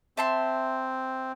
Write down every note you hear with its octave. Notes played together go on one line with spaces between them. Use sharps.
C4 E5 A5 C6